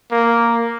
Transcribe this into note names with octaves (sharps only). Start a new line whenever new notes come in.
A#3